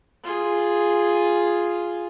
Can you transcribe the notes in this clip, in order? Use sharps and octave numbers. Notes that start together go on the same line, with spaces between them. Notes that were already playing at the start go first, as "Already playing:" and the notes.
F4 G#4